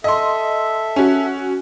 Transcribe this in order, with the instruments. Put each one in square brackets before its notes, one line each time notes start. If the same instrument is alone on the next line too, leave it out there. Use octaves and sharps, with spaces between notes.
[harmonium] A4 E5 [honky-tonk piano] D#5 C6
[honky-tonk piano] C#4 F#4